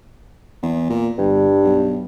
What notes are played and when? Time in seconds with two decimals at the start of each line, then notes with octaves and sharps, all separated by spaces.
0.63 E2
0.90 A#2
1.18 G1 G2
1.64 B1